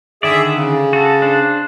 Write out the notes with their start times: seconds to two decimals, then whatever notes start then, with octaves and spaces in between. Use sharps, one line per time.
0.23 D3 D#3 G#4 D5 E5
0.54 C#3
0.93 F#4 A4
1.22 D4 C5